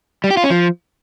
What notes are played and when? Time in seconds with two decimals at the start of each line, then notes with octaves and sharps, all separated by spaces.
0.24 G3
0.30 G4
0.37 F4
0.44 C#4
0.50 F3